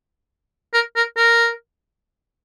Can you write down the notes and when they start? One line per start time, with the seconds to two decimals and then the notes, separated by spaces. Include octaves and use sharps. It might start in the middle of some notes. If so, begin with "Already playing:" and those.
0.74 A#4
0.96 A#4
1.17 A#4